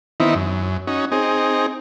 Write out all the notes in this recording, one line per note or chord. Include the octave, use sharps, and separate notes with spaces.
D#3 E3 B3 C4 D#4 E4
F#2
C#4 D#4 F#4
C4 D#4 G#4